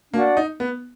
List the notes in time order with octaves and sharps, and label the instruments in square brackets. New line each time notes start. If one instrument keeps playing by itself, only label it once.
[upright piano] A#3 [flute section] D4 F#4 D5 F#5
[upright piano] D#4
B3